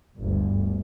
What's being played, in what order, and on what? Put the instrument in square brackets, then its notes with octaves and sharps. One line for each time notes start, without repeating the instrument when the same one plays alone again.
[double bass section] G1 D2